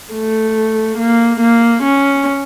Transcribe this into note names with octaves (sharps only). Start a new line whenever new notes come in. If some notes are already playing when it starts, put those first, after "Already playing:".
A3
A#3
A#3
C#4